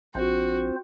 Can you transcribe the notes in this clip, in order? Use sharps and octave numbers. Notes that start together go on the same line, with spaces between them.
A#1 C4 F4 F#4 C5